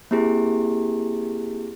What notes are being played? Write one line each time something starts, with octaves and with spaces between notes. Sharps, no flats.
A#3 C4 E4 G4 G#4